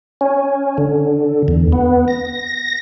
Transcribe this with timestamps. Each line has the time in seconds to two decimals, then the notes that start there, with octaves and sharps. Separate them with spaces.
0.21 C#4
0.78 D3
1.48 E2
1.72 B3
2.08 A#6